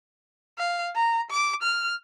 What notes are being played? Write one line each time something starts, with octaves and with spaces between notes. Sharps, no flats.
F5
A#5
D6
F6